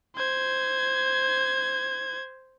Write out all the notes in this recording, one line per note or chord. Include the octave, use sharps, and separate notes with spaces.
C5 G#6